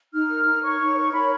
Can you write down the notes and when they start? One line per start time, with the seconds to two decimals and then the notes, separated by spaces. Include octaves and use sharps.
0.13 D#4 F6
0.30 A#4
0.46 D#4
0.63 C#5 C#6
0.80 D#4
0.97 A#4
1.13 C#5 B5